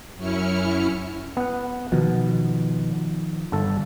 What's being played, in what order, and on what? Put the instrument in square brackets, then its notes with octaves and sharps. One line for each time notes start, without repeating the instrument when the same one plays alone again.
[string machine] F#2 C#4 E4 F6 C#7
[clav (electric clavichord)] B3 F#5
[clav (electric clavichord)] B2 [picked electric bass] D#3 F3
[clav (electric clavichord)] G1 A4